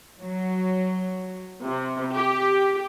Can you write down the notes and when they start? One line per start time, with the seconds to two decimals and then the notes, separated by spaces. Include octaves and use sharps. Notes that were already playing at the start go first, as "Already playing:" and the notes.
0.20 F#3
1.65 C3
2.14 G4